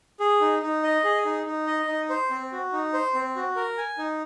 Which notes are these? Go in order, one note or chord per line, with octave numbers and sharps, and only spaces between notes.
G#4
D#4
D#4
D#5
G#4
D#4
D#4
D#5
D#4
C5
C4
F#4
D#4
C5
C4
F#4
A#4
G#5
D#4